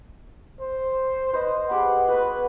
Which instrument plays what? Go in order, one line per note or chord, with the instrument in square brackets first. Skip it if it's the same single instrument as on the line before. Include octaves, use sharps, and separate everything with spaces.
[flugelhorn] C5
[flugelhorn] B4 [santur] C5 D#5
[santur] B3 G4 G#4 [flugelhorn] F#5
[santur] B3 F#4 [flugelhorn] B4